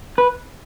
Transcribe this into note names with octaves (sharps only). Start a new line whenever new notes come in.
B4